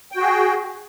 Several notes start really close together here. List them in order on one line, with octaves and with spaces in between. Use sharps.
G5 F#4 G#4